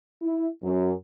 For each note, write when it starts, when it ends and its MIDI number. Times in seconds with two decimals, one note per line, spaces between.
0.21 0.47 64
0.63 0.93 42